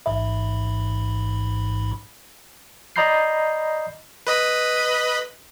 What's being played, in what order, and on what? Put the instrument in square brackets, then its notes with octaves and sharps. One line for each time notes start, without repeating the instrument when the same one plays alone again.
[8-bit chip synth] A1 G#2 B5 [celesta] E5
[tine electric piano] D5 D#5 A#5 B5 G6 C7
[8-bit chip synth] B4 D#5 B5